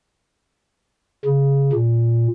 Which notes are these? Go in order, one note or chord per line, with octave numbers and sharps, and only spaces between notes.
C#3
A#2